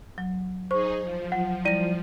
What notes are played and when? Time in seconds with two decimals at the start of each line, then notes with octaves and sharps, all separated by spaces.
0.18 F#3
0.71 D#4 G#4 C5 C#6
1.03 F3
1.32 F#3 F#5
1.65 G3 E4 D5 A#6 D#7